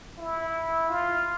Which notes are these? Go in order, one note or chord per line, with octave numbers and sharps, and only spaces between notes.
E4
F4